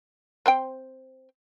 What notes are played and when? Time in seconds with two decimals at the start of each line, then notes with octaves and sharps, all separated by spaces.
0.46 C4 C5 G5